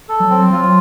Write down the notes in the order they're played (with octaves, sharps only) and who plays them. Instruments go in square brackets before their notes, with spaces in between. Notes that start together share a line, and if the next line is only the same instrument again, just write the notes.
[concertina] A4
[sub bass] F#3
[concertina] C4
[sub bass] F#3 [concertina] F4